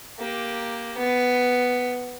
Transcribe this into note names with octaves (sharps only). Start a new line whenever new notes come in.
A#3 G4
B3